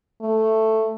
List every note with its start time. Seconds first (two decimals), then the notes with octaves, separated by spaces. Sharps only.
0.21 A3